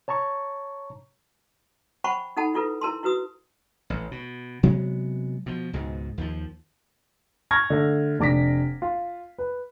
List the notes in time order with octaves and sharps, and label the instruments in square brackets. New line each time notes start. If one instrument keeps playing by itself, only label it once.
[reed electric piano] C#5 A5 A#5 C#6
[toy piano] C5 F#5 G5 A5 B5 C#6
D#4 A4 F#5 A5 B5
E4 F4 A4 B4
E4 A#4 A5 C6
E4 F#4 B4 D#6
[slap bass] A1
B2
C3 F#3 G#3 B3
B2 F3
C#2 G#2 B2
D#2 F3
[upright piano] A5 C#6 F6 G#6 A#6
D3 A3
F1 D4 D6 A#6 B6
F4
B4